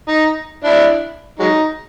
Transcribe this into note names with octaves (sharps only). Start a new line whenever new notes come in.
D#4
D4 E4
F#3 G#3 D#4